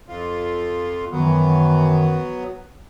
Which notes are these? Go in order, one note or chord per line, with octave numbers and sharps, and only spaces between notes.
F2 F4
F#2 D#3 E3 F#3 B3